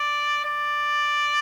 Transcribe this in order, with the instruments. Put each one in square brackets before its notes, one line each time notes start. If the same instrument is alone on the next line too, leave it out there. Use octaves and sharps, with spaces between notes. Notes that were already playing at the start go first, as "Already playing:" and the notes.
Already playing: [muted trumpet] D5
D5